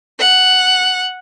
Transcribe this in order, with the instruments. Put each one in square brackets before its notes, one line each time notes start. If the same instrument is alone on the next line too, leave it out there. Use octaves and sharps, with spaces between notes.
[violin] F#5